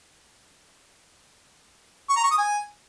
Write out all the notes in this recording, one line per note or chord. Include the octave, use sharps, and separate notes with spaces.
C#6
A#5
C#6
D#6
G#5